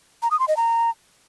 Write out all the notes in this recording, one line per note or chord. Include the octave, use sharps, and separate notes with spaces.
A#5
D#6
C6
D#5
A#5